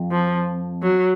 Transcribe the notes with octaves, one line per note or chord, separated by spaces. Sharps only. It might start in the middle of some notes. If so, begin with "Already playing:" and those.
Already playing: F2
F3
F#3